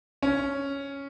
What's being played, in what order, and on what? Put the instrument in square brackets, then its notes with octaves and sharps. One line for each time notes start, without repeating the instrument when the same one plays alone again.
[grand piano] C#4